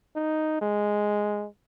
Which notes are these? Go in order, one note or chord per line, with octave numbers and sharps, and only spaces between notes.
D#4
G#3